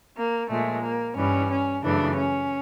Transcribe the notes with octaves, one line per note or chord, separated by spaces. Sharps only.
A#3
A#2 F3 G#3 A3
A#3
G2 E3 G3 C#4
C#4
F#2 C#3 E3 A3 D4
C#4